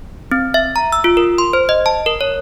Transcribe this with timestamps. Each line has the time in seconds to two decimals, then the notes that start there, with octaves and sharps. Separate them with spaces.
0.31 C4
0.54 E5
0.76 A#5
0.92 E6
1.04 F4
1.17 A#4
1.38 C6
1.53 C5
1.69 D#5
1.86 A5
2.06 A#4
2.21 C#5